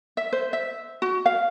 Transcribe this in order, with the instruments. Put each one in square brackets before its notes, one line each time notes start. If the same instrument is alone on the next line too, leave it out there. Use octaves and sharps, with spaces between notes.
[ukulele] E5
C5
E5
F#4
F5